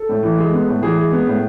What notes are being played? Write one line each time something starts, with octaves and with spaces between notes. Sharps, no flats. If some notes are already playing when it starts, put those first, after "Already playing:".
Already playing: A4
A2
E3
G#3
B3
A2
E3 G#4
G#3
B3
A2